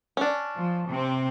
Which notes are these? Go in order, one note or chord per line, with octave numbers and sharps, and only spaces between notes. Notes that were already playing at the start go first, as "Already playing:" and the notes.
C#4 D4
F3
C3 C4